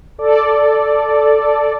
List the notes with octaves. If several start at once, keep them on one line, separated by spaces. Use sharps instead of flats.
A4 D5